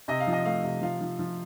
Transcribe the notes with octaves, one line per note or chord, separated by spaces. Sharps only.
C3 D#5
F5
F3
D#5
A3 F5
C3
F3 F5
F3
F3